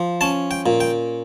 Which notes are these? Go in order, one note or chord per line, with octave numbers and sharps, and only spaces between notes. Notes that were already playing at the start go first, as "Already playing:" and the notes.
Already playing: F3
C#4 A5
G5
A#2
G5